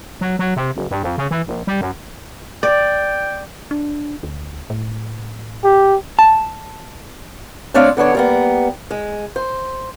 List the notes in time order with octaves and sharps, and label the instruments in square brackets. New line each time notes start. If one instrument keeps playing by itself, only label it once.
[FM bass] F#3
F#3
C3
F#1
G2
F2
C#3
E3
A#1
G3
F#2
[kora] D5 [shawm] G5
[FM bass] D4
D2
A2
[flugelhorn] G4
[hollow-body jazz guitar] A5
[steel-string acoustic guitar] A3 C4 D4 C#5 D5 F5
D3 B3 D4 C#5
G3 A#3 B3
G#3
C5